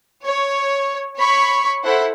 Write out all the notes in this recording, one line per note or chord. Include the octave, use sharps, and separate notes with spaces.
C#5
C#5 B5 C#6
E4 A4 C5 F#5